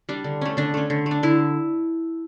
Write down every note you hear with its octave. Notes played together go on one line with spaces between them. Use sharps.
G3 D4
D3
A3 C#4
D3 D4
A3 C#4
D3
A3
D4
D3 E4